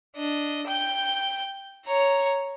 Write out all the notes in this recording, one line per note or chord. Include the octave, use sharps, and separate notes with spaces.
D4 D#5
G5 G6
C#5 A#5